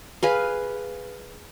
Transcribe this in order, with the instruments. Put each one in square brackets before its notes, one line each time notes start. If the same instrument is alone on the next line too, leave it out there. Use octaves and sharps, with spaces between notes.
[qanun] G#4 B4 F5